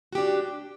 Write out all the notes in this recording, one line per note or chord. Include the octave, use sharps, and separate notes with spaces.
D4 F#4 G4